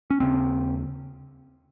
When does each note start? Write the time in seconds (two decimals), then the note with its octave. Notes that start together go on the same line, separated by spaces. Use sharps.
0.10 C#4
0.20 D#2 C#3 C4